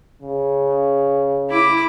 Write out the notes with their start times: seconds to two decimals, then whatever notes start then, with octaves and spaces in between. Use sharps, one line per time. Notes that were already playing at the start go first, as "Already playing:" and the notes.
0.22 C#3
1.50 E4 D6